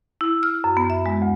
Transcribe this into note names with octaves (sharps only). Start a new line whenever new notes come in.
E4
F6
F#2
B3
E5
G#3
D2